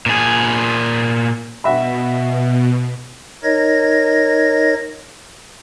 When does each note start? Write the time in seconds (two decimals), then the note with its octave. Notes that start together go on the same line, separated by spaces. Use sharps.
0.06 A#2 G#4
1.64 B2 F#4 E5 B5
3.43 D#4 A#4 C#5 D#5 G#6 A#6